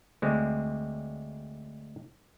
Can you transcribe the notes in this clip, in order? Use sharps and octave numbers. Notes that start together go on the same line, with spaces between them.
D2 D3 G#3 C4